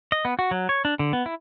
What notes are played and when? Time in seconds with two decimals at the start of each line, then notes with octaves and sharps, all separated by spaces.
0.12 D#5
0.25 B3
0.39 F#4
0.51 F#3
0.69 C#5
0.85 D4
0.99 D3
1.13 B3
1.26 E4